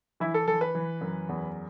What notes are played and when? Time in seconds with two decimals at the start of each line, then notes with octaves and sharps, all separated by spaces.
0.20 E3 E4
0.34 A4
0.47 E3 A4
0.61 B4
0.75 E3
1.01 F#2
1.29 E2